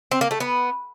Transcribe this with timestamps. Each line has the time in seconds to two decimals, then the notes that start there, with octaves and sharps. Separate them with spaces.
0.11 C4
0.21 A#3
0.31 A3
0.40 B3